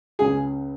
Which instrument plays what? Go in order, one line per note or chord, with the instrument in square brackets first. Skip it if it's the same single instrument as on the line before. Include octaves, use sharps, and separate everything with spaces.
[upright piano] C#2 C#3 G#3 C#4 [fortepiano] G#4